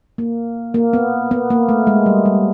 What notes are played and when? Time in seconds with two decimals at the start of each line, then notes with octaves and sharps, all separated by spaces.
0.18 A#3
0.74 A#3
0.93 B3
1.31 B3
1.50 A#3
1.69 A3
1.87 G#3
2.06 G3
2.25 G3